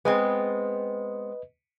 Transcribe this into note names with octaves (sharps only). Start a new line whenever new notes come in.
G#3 B3 C4 B4 D#5